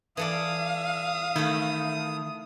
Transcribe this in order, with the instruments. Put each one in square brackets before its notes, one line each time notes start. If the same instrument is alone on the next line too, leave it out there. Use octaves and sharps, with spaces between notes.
[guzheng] E3 A4 D5 [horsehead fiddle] F5 [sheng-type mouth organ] D#6
[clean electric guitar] D#3 [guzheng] A3 E4